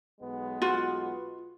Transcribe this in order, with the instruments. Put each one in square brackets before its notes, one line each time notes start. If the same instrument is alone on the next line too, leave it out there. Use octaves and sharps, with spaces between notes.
[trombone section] B1 G#3 B3
[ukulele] F4 F#4